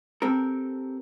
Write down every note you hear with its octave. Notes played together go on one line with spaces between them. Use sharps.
C4 G4 A4 A#4